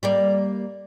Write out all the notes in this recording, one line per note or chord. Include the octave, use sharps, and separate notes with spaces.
G3 A#3 D5